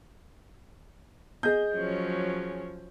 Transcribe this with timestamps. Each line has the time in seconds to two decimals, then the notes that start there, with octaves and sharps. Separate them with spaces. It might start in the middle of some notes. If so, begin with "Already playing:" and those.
1.43 G#4 D#5 G6
1.75 F3 F#3 C#4